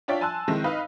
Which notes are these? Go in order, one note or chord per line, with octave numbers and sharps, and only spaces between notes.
D4 F4 C#5 D5 E5 G5
G#5 A5 C6 E6 F#6
D#3 G#3 C4 E4
D#4 B4 D#5 F5